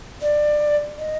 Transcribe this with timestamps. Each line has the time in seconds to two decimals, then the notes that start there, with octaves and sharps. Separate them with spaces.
0.22 D5
0.99 D#5